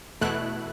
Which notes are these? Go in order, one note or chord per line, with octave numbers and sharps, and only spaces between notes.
E2 B2 A3 E4 F#6